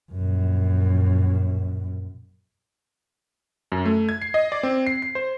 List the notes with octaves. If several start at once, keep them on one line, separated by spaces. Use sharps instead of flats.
A#1 F#2
F#2
A3
G#6
C7
D#5
D5
C4
C7
C7
C5